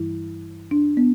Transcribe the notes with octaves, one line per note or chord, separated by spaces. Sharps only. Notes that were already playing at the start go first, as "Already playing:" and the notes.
Already playing: G2 E3 G3 E4
D4
B3